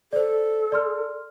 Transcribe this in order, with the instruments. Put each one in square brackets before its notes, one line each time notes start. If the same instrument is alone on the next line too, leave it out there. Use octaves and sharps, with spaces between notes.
[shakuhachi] A4 [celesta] C5 D5
[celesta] D5 C6 F6